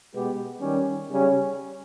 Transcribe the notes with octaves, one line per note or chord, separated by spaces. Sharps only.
B2 G#3 B3 G4
D#3 G3 C#4 G4
C#3 G3 C#4